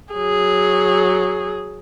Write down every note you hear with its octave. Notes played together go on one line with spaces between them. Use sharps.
F#3 G#4